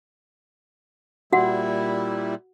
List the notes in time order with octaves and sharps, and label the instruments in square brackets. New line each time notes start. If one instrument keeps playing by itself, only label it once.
[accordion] A#2 G3 E4 [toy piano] F#4 F#5